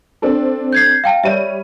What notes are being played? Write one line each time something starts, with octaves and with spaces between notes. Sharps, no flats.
C4 D4 A4
G6 G#6 C7
F5 G5 A5
G3 C#5 D5 E5 D#7